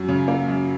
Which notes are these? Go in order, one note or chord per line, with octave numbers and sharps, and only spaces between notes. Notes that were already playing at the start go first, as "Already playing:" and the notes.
Already playing: F#2 F#3
C#3
A#3
F#2